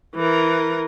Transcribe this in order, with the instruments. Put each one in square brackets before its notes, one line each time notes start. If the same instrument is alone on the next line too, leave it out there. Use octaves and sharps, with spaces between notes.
[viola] E3 A#4